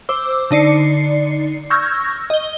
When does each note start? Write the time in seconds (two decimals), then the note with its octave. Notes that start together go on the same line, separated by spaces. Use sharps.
0.09 C5 D6 E6
0.51 D3 D#4 D5 C7 C#7
1.70 C#6 E6 F6 G6 G#6 A#6
2.30 D#5 G7